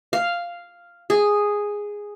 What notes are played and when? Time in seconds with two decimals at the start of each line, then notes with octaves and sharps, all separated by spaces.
0.13 F5
1.10 G#4